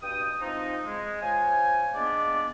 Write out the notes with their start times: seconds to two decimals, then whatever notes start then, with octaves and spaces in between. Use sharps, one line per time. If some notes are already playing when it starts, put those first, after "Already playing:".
0.03 G2 B2 G5 D#6
0.41 F3 G#3 C4 D#4
0.87 G#3
1.22 F4 C5 C#5 G#5
1.95 G#3 A#3 B3 D4 D5